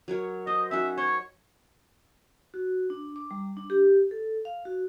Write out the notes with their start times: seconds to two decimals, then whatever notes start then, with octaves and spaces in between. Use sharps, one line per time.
0.08 F#3 A#4 C#5
0.47 C5 D#5
0.71 C#4 D#4 F#4 E5
0.98 C5 C#5
2.54 F#4
2.90 D4
3.16 D6
3.31 G3
3.57 D4
3.70 G4
4.11 A4
4.45 F5
4.65 F#4